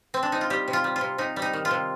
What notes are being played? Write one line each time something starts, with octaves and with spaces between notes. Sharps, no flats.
C4
D4
D#4
F4
G3 G4
C3
F4
G3
F4
C3
C3 D#4
G3
D#4
D#3
F4
C3